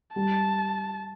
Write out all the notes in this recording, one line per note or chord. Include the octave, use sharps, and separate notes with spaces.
G3 A5